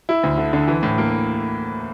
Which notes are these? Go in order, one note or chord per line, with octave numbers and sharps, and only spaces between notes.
E4
D2
D3
D3
E3
A2
A#3